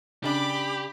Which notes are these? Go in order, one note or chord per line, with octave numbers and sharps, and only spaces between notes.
C#3 D4 G4 B5 D6